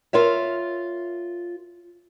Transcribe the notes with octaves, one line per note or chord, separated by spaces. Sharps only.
F4 A#4 C#5 E5